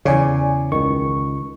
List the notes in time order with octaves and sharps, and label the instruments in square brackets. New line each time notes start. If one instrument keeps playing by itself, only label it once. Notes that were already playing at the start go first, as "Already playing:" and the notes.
[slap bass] E2 C#3 [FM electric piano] C#5 D5 G#5
[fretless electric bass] C#2 D#3 [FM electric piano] C#6